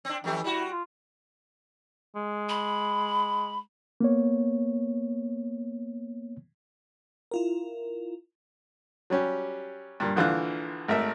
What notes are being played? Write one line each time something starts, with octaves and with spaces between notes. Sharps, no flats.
C4 D4
F2 E3 A3 G4
G3 E4 F#4
F4
G#3
B5
A#3 B3 C#5
E4 F4 A#4
F#3 G3 C#4 G4
G2 A#2
A#1 D3 E3 F4 F#6
G#1 A3 A#4 E5